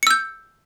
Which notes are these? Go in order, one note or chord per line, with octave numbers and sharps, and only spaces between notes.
E6 G6 C#7